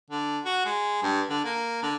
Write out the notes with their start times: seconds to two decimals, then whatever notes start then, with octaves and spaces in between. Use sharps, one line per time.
0.11 D3
0.45 F#4
0.65 G#3
1.03 G2
1.29 D3
1.44 A#3
1.82 D3